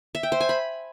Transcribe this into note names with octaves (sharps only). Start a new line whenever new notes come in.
E5
G5
C5
G#5
B5